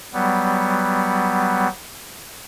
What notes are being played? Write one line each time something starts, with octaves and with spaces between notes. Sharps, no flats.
F#3 G3 B3